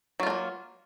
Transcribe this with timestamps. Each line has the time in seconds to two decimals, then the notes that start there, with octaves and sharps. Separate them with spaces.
0.20 F#3
0.23 F4
0.27 A3
0.30 A#3